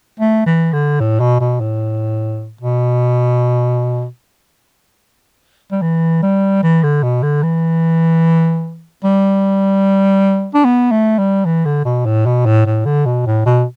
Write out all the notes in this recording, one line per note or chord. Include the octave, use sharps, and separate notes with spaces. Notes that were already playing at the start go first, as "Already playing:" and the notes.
A3
E3
D3
A2
B2
B2
A2
B2
G3
E3
G3
E3
D3
B2
D3
E3
G3
D4
B3
A3
G3
E3
D3
B2
A2
B2
A2
A2
D3
B2
A2
B2